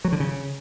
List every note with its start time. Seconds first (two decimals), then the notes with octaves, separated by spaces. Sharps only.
0.05 F#3
0.12 D3
0.20 C#3